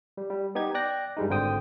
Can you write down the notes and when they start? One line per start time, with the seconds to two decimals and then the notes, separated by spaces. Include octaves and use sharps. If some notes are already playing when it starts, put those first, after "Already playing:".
0.17 G3
0.30 G3
0.55 B3 D#4 G4 G#6
0.74 D5 G5 F#6 A#6
1.17 G2 G3 G#3 D#4
1.30 G#1 D3 C5 G5 D#6